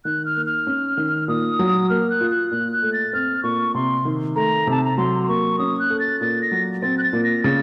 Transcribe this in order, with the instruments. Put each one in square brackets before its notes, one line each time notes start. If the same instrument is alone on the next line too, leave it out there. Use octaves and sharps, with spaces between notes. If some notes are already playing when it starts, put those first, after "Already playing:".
[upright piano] D#3 [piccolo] F#6
[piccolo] F6
[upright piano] A#3
[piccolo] F6
[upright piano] C#4
D#3
[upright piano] A#2 [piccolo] D#6
[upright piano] F#3
[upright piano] A#3 [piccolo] F6
[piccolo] F#6
[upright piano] F4
[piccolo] F#6
[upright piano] A#2 [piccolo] F#6
[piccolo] F#6
[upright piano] A3
[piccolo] A6
[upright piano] C4 [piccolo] F6
[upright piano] A#2 [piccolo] C#6
[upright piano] C3 [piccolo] C6
[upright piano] D#3
[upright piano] A3 [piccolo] A#5
[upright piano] C3 [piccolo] A5
[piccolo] A#5
[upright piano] F#3 [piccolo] C6
[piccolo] C6
[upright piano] A#3 [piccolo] C#6
[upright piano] C#4 [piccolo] D#6
[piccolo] F#6
[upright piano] A4
[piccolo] A6
[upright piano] A#2 [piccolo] A6
[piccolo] A#6
[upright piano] F#3
[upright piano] C4 [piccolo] A6
[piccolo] F#6
A6
[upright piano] A#2
[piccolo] A#6
[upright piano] C#3 [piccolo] A6